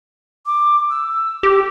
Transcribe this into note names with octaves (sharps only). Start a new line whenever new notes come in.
D6
E6
G4 D6